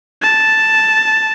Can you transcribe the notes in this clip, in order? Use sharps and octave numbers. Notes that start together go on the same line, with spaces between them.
A5